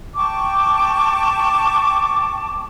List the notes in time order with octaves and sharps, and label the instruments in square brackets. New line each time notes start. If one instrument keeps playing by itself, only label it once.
[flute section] G5 A5 C#6 D6